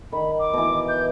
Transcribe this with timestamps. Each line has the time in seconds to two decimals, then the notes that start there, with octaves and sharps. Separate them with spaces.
0.12 D#3 B5
0.39 D6
0.54 B2 E3
0.88 G6